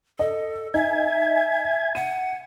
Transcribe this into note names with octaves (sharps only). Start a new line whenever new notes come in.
A4 D#5
D#4 E5 G#5
F#5 D#7